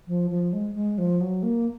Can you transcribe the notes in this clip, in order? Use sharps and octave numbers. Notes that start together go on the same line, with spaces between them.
F3
F3
G#3
G#3
F3
F#3
A#3